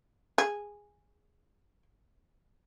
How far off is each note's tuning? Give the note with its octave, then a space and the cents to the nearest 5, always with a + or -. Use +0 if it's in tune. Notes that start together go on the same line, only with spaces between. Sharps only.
G#4 -10